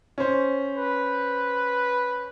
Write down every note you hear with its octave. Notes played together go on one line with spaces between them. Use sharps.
C#4 C5
B4